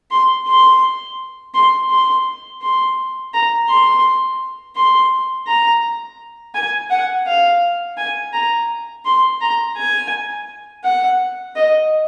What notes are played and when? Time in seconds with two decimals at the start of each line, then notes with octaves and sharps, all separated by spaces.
0.11 C6
0.48 C6
1.54 C6
1.91 C6
2.62 C6
3.34 A#5
3.69 C6
4.76 C6
5.48 A#5
6.55 G#5
6.91 F#5
7.27 F5
7.98 G#5
8.33 A#5
9.06 C6
9.42 A#5
9.77 G#5
10.84 F#5
11.56 D#5